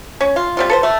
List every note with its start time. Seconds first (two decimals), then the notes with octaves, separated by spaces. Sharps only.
0.21 C#4
0.36 F4
0.57 G3 C4 F4
0.70 A4 B4 C5
0.83 A3